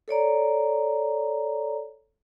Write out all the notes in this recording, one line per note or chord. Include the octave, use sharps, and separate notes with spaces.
A4 C#5 D5 A#5